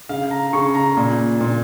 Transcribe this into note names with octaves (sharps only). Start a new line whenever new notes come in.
C#3 F5
A#5
C#3 C#6
A#5
A#2
A#2